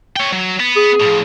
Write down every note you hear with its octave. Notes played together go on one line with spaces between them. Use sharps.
C#5 G5
F#3
B3
G#4
A2 F3